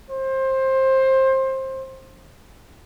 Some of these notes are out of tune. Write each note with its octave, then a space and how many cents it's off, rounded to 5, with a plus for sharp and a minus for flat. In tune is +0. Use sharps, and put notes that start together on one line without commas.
C5 +20